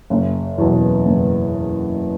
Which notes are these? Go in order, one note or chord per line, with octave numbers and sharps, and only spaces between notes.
F#1
E2 B2 F#3
F#1